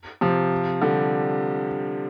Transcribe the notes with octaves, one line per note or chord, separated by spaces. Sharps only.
C3 F3
D3 G3